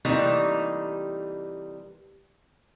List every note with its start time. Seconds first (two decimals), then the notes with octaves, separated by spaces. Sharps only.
0.05 C3 E3 G3 A3 A#3 D#4